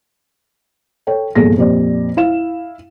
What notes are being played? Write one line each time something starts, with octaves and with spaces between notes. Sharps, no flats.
A4 C#5 G5
A#1 E2 G2 G#4 A4 A#6
F2 A#2 G4 D5
E4 F5 E7